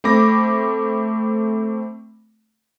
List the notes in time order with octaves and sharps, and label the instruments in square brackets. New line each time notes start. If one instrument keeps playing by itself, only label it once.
[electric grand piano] A3 C4 B5 D6 A#6